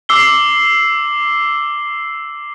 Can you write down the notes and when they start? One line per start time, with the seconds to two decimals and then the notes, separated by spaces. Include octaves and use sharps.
0.09 D6 E6 C7 G7